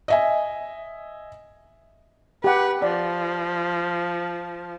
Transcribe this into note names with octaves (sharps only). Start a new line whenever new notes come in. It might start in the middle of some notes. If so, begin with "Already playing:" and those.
D#5 E5 G#5
G4 B4 F#5
F3 D5